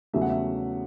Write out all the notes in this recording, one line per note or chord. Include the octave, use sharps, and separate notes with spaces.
E2 C#3 F#3 A3 E5
F#5
E5